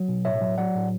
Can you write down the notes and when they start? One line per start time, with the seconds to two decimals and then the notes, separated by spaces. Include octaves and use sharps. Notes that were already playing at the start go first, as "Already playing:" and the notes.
Already playing: F#3
0.08 B2
0.25 A2 C#5 E5
0.41 F#3
0.58 F#3 D5 F#5
0.75 A2